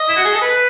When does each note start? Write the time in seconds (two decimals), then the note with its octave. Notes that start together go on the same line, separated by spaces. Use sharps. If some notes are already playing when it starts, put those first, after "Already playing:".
Already playing: D#5
0.09 E4
0.16 F#4
0.25 G#4
0.34 A4
0.41 B4